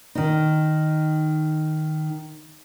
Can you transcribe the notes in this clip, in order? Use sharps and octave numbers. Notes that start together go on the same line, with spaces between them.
D#3 D#4